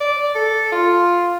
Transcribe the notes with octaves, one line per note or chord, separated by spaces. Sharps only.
D5
A4
F4